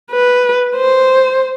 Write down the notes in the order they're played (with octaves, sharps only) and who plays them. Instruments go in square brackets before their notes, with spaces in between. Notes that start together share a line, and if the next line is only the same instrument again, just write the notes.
[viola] B4
C5